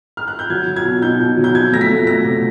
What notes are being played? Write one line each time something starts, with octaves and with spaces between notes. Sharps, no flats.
F6
F#6
G6
F#3 G#6
F#3
G#6
B2
D#4 G6
B2
F#3
G6
F3 G#6
A3 A#6
B6
A3
A3 A#6
C3